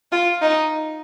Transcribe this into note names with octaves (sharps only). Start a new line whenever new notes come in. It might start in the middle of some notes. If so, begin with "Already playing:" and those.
F4
D#4